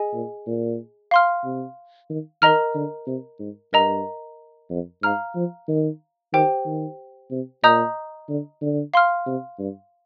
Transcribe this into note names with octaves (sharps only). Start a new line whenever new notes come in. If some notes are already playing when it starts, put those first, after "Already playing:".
Already playing: G#4 D#5 G#5
A#2
A#2
F5 C6 F6
C3
D#3
D#3 A#4 D#5 A#5 F6
D3
C3
G#2
G2 A#4 D#5 A#5
F2
G#2 F5 A#5 F6
F3
D#3
D#3 G4 C5 G5
D#3
C3
A#2 D#5 A#5 D#6 G6
D3
D3
F5 C6 F6
C3
G2